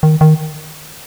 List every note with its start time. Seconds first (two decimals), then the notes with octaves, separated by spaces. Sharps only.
0.03 D#3
0.21 D#3